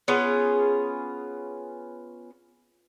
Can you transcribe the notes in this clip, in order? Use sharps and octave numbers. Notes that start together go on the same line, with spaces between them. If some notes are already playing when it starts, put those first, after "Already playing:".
B3 C#4 F4 G#4